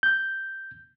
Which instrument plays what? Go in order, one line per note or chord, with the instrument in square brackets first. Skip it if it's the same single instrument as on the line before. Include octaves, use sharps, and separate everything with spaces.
[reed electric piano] G6